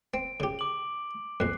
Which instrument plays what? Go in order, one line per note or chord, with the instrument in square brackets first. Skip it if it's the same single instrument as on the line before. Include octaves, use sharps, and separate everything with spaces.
[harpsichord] C4 [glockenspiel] D7
[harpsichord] C#3 G4
[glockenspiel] D6 F#7
[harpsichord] A#1 F2 [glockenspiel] F#6 C7